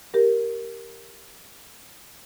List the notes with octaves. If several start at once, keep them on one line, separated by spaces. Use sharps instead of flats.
G4 A#4